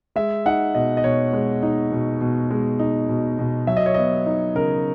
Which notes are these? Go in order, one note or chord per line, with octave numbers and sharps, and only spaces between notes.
G#3 E5
D#4 F#5
B2 D#5
D#5
B2 C#5
G#3
D#4
B2
B2
G#3
D#4
B2
B2
F#3 E5
D#5
C#5
B3 D#5
D#4
C#3 A#4